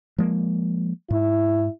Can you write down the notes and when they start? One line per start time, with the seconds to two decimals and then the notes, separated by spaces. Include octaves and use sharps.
0.19 F3 G#3 A#3
1.11 G#2 E4